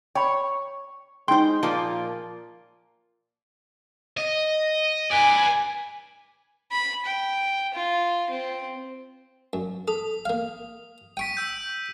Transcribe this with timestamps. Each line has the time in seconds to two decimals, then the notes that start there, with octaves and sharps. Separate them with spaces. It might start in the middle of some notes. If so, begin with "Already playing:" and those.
0.15 C#5 G5 B5
1.28 G#3 D#4 C5 G5 C6
1.63 A#2 F3 A#3 F4
4.17 D#5
5.11 B4 D5 G#5
6.72 B5
7.05 G5
7.74 F4
8.30 C4
9.53 F#2
9.88 A4 D#6
10.25 A#3 F5
11.17 G5 C#6 B6 D7 D#7
11.35 E6 G6 B6